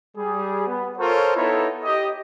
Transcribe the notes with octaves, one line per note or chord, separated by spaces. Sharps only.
G3 G#4
B3
F4 A4 A#4 C5 C#5
B3 D#4 E4 A4 B4 C#5
G4 D#5